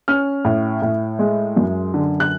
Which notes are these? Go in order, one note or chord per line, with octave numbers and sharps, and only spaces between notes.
C#4 F6
A2
A2
G#3
F#2
D3
F#6